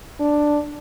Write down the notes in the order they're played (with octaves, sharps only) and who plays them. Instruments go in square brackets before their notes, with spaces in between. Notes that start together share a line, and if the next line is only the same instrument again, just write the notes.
[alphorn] D4